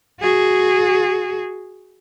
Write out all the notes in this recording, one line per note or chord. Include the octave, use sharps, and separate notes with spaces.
F#4 G#4